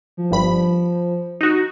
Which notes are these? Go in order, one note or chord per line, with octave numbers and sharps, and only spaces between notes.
F3
G1 G2 B5
D#4 F#4